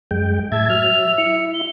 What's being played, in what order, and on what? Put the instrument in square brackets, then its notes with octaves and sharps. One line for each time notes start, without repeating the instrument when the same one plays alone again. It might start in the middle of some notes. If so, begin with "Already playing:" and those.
[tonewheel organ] F#2 G#3 G5
[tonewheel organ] A2 A5 G#6 [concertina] E5
[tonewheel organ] F#3 F6 [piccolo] F7
[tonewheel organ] E4 [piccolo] C#7
[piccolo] G7